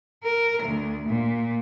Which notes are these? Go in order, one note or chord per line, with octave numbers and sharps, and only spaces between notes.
A#4
D2
A#2